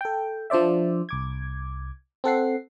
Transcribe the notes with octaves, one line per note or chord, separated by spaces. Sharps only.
A4 G5
F3 D4 C5 D5 E5
C2 D6 G#6
C4 A4 F#5 C7